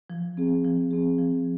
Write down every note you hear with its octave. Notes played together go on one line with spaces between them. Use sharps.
F3
C4 G#4
F3
C4 G#4
F3